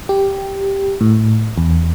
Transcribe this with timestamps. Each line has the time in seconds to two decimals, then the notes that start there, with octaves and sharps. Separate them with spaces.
0.09 G4
1.01 A2
1.58 E2